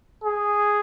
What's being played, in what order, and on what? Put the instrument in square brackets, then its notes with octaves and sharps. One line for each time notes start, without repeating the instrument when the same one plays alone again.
[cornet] G#4